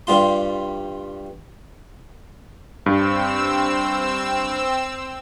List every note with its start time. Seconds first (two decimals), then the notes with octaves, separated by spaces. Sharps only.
0.07 G2 G3 F4 C6
2.86 G2 C4 E6